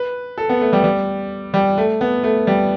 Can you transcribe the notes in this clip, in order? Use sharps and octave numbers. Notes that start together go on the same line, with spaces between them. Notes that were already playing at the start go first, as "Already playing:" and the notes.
Already playing: B4
A4
B3
A3
G3
G3
G3
A3
B3
A3
G3